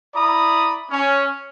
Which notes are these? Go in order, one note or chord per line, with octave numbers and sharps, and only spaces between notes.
E4 D5 A#5 B5 D#6
C#4